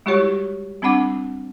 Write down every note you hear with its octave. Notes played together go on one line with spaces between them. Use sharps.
G3 G#3 E4 F#4 G4 C#5
G3 C4 D4 F#5 D6